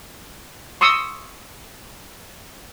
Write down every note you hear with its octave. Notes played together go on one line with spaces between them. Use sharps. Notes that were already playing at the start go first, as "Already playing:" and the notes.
C6 C#6 D#6 E6